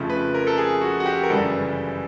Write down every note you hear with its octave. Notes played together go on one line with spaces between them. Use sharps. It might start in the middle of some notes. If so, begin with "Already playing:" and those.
Already playing: F2 C#3 F3 A3
B4
A#4
A4
G#4
F#4
F#4
G4
A#4
G1 F#2 C#3 E3 G3 A4